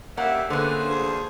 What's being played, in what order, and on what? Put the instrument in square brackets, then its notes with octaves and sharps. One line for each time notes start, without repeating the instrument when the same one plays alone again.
[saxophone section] G3 C#4 G4 [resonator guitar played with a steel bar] A#3 F#5 [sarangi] E5
[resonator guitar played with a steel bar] D3 B3 [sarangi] A#3 [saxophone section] C#4 G#4 B4 [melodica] C5
[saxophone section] D2 F4 G#4